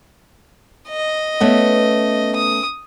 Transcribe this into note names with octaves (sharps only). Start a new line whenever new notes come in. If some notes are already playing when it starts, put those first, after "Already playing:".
D#5
A3 B3 C#4
D#6